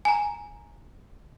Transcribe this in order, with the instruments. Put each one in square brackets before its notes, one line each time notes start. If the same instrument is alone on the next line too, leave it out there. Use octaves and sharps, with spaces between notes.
[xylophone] G#5 A#5